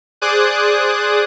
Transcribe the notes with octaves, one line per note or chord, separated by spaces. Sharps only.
G#4 C5 D5 D6 D#6 F#6